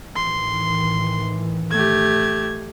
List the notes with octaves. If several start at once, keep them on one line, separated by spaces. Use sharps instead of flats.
A2 D#3 E3 C6
A3 G4 G#6